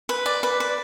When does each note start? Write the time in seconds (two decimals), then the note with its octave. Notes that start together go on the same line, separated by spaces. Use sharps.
0.09 B4
0.26 D5
0.43 B4
0.60 B4